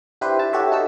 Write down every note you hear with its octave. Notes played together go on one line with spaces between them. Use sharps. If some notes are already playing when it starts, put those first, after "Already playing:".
D4 E4 G4 B4 C5
E4 A5
F#4 G4 A4 C#5 E5
D#4 A4 E6